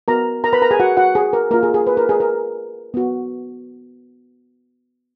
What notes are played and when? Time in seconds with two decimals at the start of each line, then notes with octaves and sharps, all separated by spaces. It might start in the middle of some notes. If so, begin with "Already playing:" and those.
0.08 B3 F#4 A#4 A#5
0.44 A#4 A#5
0.53 B4 B5
0.62 A#4 A#5
0.71 G#4 G#5
0.80 F#4 F#5
0.97 F#4 F#5
1.15 G#4
1.33 A#4
1.51 A#3 C#4 F4 A#4
1.63 G#4
1.74 G#4
1.87 B4
1.97 A#4
2.09 G#4
2.20 A#4
2.94 B3 F#4